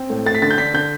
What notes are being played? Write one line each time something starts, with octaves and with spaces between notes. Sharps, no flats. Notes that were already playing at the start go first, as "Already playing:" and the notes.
Already playing: C4
A2
A3 A6
B6
D3 A6
G6
D4 B6
D3 G6